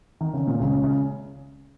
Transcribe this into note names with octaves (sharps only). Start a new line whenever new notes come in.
D#3
C#3
A#2
C#2 C#3
C#3